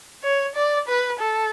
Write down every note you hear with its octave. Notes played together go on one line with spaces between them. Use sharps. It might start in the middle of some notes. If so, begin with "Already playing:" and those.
C#5
D5
B4
A4